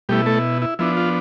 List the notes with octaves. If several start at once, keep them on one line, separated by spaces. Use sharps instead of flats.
B2 G3 A3 E4 G4
A3 A4
E4
F3 B3 D4 E4
F4